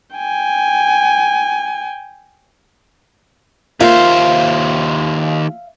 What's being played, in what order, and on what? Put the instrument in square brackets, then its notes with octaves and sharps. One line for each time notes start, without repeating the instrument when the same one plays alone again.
[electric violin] G5 G#5
[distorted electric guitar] D#2 C5 [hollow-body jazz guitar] A#3 F4 [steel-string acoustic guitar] E5 F5